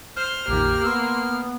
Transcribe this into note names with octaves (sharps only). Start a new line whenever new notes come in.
C5 F6
A#1 F2 D#3 A#3 G4
B3 C6 E6